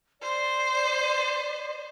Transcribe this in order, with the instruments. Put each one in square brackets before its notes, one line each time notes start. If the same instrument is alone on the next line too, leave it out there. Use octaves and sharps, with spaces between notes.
[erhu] C5 [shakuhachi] D5